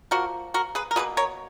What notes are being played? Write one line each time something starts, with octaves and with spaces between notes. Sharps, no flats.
F3 A#3 F#4 A#4
F#4 A#4
G#4 B4
A#4
B2 A#3 G#4 B4
A#4 C#5